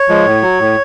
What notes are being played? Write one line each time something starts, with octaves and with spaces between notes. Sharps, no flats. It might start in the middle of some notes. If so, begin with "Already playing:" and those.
Already playing: C#5
F3 G#3
A2
F#3
A2